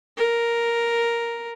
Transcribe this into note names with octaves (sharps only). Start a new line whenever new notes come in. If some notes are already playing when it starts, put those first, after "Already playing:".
A#4